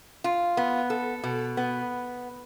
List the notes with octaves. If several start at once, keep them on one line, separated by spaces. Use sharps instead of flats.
F4
B3
A4
B2
B3